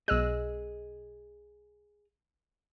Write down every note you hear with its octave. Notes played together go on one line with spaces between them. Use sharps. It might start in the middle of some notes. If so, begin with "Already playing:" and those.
B1 G#4 D#5 E6 F#6